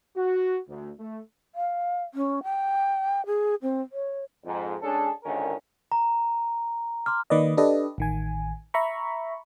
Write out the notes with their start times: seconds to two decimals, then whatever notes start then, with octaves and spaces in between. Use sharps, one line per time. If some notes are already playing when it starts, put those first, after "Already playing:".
0.16 F#4
0.68 D2
0.99 A3
1.55 F5
2.14 C#4
2.43 G5
3.26 G#4
3.62 C4
3.92 C#5
4.45 F2 G#2
4.82 G#3 C#4 D4 G#4 A4
5.24 G#1 C#2 D3 D#3 C#4 A#4
5.92 A#5
7.06 C6 D6 F6
7.30 D#3 A#3 B4 D5 D#5
7.57 D4 G4 A4 B4 D5 D#5
7.98 A1 D#3 G#5
8.74 E5 A#5 B5 C#6